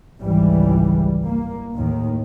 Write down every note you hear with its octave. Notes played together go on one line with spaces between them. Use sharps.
G#1 C#2 E3 G3
A#3
D#2 A2 D#3